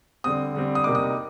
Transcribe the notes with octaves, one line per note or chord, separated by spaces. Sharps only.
D3 G3 C4 D#6
D3 G3 C4
D#6
C3 G3 A#3 D#4 D6
D#6